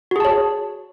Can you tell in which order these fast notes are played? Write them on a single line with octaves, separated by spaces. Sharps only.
F#4 G#4 A5 C#5